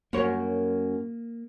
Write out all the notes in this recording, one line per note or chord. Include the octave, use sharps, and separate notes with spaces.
F#2 A#3 C#5